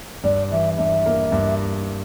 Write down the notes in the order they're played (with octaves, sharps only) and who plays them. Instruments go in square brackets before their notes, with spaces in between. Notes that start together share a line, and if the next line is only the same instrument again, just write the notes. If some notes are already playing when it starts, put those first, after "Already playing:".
[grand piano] G2 [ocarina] D5
[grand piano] E3 [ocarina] E5
[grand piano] G2 [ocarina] E5
[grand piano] A#3
G2